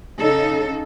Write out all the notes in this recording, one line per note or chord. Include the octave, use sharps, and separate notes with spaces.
C#3 D#4 A4